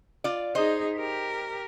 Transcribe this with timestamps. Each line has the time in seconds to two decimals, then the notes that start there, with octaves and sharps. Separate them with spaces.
0.24 F4 D5
0.55 D#4 G#4 C5 D#5
0.97 G4 A#4